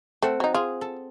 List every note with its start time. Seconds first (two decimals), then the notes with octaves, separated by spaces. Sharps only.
0.22 A3 C4 F#5
0.40 F#3 D#4
0.54 F4 G#4
0.81 A4